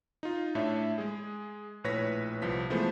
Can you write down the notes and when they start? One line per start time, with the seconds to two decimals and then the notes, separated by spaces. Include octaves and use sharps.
0.23 D#4 F4
0.55 A2 D4 C#5 E5
0.98 G#3 G#4
1.84 A#1 A2 B4 C#5 A#6 B6
2.42 C2 F3 B6
2.70 E3 F3 G#3 A3 B3 C5